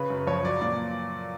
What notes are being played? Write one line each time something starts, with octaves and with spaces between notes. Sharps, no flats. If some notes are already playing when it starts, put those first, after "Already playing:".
Already playing: C#3 B4
F#2
F3 C#5
F#3 D5
A#2 D5